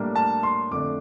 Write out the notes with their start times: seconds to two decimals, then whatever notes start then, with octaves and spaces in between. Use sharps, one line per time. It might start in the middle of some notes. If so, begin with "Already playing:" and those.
Already playing: A2 G3 A#3 D4
0.16 A5
0.43 C6
0.71 F2 D3 A3 D4 D6